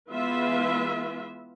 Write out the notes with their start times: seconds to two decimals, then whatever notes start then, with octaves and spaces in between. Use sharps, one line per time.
0.11 E3 G#3 B3 F4 B4 E5